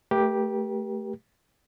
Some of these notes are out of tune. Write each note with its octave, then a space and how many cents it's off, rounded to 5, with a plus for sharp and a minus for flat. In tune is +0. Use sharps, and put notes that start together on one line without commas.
A3 +0 G4 +0 A#4 +45